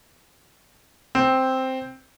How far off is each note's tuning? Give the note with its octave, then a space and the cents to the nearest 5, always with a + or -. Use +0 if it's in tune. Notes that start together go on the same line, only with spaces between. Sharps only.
C4 +0